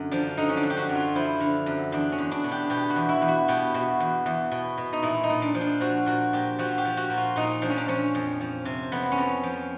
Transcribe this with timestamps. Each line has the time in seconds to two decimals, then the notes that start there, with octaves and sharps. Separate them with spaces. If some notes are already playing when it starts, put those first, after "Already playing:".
Already playing: F#2 D3
0.11 F3 D4
0.37 D3 D#4
0.49 C#4
0.57 D4
0.63 F#2
0.70 G4
0.77 F#4
0.89 F#2
0.95 F4
1.15 F3 E4
1.40 D3
1.66 F#2
1.92 E2 D4
2.12 C#4
2.18 E2
2.32 D4
2.44 B2
2.52 G4
2.70 B2 G4
2.90 F#4
2.96 E2
3.09 E4
3.22 E2
3.28 F#4
3.48 B2 G4
3.74 B2 F#4
4.00 E2
4.26 E2
4.51 B2
4.78 B2
4.93 D#4
5.03 A#2 E4
5.23 D#4
5.30 A#2
5.42 D4
5.55 F3
5.61 D4
5.80 F3 F#4
6.06 A#2 F#4
6.33 A#2 G4
6.59 F3 F#4
6.78 G4
6.85 F3
6.97 F#4
7.10 A#2
7.17 F4
7.36 A#2 D#4
7.62 F3 D4
7.70 C#4
7.78 D4
7.88 F3 C#4
8.15 F2
8.41 F3
8.65 C3
8.92 F2 B3
9.12 C#4
9.18 F2
9.43 F3